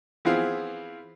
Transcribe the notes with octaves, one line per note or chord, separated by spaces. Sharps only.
E3 B3 C4 F4 G#4